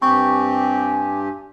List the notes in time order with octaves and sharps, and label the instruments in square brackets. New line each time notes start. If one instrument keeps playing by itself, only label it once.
[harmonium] G2 G4 [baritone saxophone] C4 [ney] G#5 [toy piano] C#6